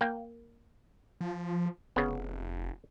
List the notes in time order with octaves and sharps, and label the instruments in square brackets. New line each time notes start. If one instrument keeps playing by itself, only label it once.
[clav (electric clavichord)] A#3 G5
[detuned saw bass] F3
[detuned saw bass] F1 [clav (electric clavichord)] C#3 B3